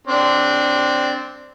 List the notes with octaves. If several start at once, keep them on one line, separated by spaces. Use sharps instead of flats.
C4 D4